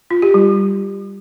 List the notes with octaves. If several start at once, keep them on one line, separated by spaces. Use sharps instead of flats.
F4
G4
G3